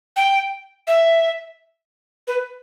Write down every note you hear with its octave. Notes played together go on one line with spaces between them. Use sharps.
G5
E5
B4